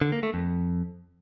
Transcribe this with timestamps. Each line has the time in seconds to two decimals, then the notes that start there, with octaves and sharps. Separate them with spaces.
0.01 D3
0.12 A#3
0.23 A3
0.34 F2